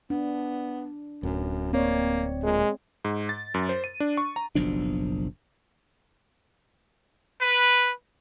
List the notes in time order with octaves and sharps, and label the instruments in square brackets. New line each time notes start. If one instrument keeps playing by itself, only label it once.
[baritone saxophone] B3 [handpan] D4
[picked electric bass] D1 [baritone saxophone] F#2
[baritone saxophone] A#3 [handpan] C4 C#5 D5
[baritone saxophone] A#2 [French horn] G#3
[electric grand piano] G#2
A6
F#2
C5
D#7
D4
C#6
A#5
[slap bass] F#1 B1 F3 D4
[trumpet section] B4